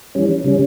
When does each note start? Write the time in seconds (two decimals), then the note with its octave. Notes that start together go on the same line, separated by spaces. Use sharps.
0.15 E3 G3 C#4
0.44 C#3 G3 C#4